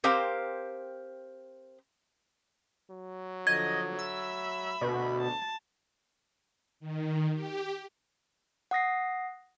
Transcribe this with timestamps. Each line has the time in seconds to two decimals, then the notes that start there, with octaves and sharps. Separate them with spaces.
0.04 C4 G4 A#4 C5 F5
2.90 F#3
3.47 D3 F3 D#5 G#6
3.99 E5 B5 E6
4.81 D2 B2
5.21 A5
6.80 D#3
7.34 G4
8.71 F#5 D#6 A#6 C7